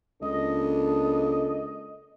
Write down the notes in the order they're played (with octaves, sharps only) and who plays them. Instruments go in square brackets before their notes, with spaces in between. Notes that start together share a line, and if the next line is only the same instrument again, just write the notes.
[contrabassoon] C#2 [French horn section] A#3 D4 A4 [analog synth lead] D#5